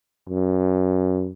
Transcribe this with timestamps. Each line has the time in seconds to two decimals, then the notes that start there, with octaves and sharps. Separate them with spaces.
0.29 F#2